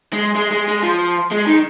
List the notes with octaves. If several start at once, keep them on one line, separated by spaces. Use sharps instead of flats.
G#3
G#3
G#3
G#3
F3
G#3
D#3